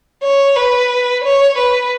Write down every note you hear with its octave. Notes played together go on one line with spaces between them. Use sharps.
C#5
B4
C#5
B4